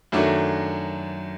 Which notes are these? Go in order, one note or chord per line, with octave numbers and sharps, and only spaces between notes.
F#2 D#3 F#3 A3 D4